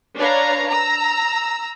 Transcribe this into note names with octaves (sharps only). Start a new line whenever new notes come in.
D4 B4 C#5 F5 A#5
A#5 E6